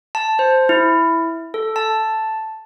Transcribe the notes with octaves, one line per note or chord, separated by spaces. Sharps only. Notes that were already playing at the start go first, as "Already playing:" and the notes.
A5
C5
E4
A4
A5